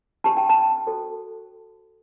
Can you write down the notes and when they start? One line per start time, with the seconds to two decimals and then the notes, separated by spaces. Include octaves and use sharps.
0.24 D4 G4 C5 A5
0.37 G5
0.49 A5
0.87 F#4 A4 C5